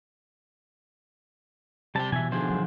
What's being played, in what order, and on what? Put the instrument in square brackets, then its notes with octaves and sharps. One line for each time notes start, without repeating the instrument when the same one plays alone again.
[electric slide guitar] C3 C4 G4 [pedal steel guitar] G3 A5
[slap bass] B2 [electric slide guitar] E3 [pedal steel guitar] E5 G#5
[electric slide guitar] D3 D#3 F3 [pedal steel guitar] G#4 C5
[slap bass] F#3 G3